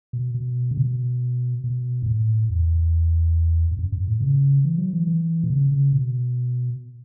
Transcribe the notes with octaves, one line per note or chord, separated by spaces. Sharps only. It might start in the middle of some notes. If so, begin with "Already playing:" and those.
B2
B2
C#3
B2
B2
G2
A2
E2
G2
F#2
G2
A2
C#3
E3
F#3
E3
E3
B2
C#3
C#3
B2